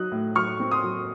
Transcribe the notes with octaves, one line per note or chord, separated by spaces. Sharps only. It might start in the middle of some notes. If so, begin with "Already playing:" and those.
Already playing: F#3 D#4 D#6 F#6
A2
F#3 C#6 F6
C4
C6 D#6
F#3